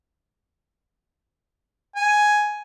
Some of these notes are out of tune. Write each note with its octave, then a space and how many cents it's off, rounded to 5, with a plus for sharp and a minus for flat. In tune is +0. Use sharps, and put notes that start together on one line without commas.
G#5 +5